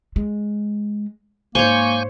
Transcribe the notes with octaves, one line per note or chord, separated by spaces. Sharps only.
G#3
G#2 A#3 C5 C#5 G#5 C#6 G6